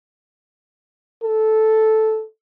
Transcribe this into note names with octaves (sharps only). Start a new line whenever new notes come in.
A4